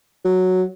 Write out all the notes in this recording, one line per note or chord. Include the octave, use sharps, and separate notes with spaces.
F#3